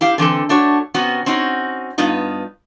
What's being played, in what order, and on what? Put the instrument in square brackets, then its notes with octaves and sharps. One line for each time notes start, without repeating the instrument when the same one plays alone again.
[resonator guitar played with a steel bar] E4 G4 F5
D3 E3 C4 A4
A3 D4 F#4 C#5
C3 B3 C#4 F#4
C4 C#4 D#4 F#4
G2 B3 D#4 F4